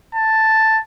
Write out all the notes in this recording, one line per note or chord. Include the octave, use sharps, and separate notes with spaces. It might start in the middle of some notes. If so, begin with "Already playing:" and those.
A5